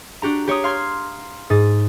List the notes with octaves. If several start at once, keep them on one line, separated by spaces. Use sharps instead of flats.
D4 F#4 G4 A#5
G4 C#5 A#5 D#6
F5 C6 G#6
G#2 D#6 A6